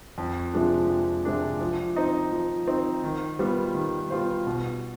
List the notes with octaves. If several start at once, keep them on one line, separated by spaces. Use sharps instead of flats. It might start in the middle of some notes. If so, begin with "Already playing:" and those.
F2
C3 F3 G#3 D4
F2
C3 F3 G#3 D4
F3
C4 D#4
F3
C4 D#4
D#3
G3 B3 F4 C5
D#3
G3 B3 F4 C5
B2